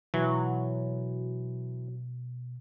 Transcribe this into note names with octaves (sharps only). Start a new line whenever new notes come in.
B2 E3 F#3